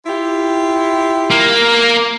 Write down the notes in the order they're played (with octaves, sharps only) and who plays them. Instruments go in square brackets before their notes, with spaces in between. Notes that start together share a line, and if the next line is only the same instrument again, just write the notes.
[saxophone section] E4 F4 G4
[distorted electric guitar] A#3